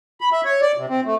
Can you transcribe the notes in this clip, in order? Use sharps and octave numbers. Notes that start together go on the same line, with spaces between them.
B5
E5
C#5
D5
C3
C4
A3